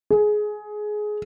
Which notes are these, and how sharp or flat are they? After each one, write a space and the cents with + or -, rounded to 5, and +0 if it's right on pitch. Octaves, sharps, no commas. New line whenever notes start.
G#4 +15